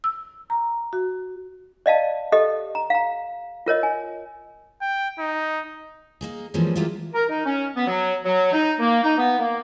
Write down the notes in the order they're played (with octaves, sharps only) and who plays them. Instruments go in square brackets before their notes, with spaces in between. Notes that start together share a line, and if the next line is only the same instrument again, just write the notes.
[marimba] E6
A#5
F#4
[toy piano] D5 D#5 F5 A5
G4 A4 D#5
A#5
F5 A#5
F4 A#4 C#5 D#5
G#5
[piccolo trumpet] G5
D#4
[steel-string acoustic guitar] A#3 D#4 G#4
E3 F3 G3 G#3 A#3 C#4
F#3 G#3 A#3 E4 F4 G4
[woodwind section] A#4
D#4
C#4
B3
F#3
F#3
D#4
A#3
D#4
B3
A#3